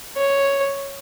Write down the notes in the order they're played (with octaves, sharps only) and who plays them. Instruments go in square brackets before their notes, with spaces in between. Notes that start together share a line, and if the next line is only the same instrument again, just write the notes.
[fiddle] C#5